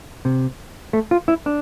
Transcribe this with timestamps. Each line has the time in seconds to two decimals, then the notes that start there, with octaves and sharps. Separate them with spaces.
0.25 C3
0.93 A3
1.11 F4
1.28 E4
1.46 D4